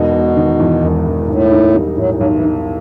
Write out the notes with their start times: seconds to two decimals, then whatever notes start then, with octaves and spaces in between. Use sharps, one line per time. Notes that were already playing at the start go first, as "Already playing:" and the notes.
Already playing: E1 B2 D#4
0.14 E1
0.37 D#3
0.60 E2
0.82 E1
1.06 E1
1.28 B1 A2
1.51 D#4
1.75 G3
1.97 A2 F#3
2.09 E3
2.15 F#3
2.21 B1
2.32 E3
2.44 D#4